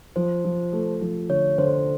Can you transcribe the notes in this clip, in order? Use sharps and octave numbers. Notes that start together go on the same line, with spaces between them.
F3 C5
F3
A3
F3
D3 C#5
D3 C5